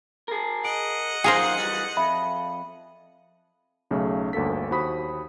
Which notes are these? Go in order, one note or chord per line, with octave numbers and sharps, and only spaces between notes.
G#4 A#4
D#5 F#5 D7
F#2 D#4 F4 G#4 A#4 C5
E3 G3
F2 E5 B5
B1 C#3 A3
G1 D2 A#3 A4 B6
D#2 F#4 C5 B5 D#6 B6